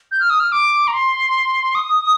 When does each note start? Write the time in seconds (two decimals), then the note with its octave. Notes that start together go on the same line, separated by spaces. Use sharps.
0.11 G6
0.20 F6
0.30 D#6
0.40 F6
0.52 D6
0.87 A#5
0.93 C6
1.75 D#6